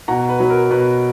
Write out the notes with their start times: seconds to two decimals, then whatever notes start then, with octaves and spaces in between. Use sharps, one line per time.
0.08 B2 F#5 A#5
0.29 B4
0.40 F#3 B4
0.50 A#4
0.70 B2 B4